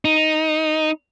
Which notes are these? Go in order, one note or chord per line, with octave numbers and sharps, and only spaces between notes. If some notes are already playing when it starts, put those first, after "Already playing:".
D#4